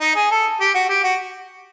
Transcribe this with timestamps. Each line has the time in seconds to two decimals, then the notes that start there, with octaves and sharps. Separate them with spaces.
0.01 D#4
0.15 G#4
0.31 A4
0.60 G4
0.74 F#4
0.89 G4
1.03 F#4